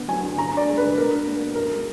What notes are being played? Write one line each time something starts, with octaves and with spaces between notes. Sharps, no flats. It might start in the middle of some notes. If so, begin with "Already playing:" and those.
Already playing: D3 B3 D4
F#3 G#5
D3
D3 A#5
D4 D5
G#3
B4
D3
B2 A#4
D4
A#3
B2
F#2 A#4
G#3